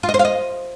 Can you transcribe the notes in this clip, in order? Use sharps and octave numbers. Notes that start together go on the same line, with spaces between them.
F4
D#5
C5
F5
D#5